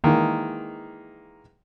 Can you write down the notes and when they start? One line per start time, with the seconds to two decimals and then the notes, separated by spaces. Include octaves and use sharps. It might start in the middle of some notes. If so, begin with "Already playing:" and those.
0.04 D#3 E3 G#3 A#3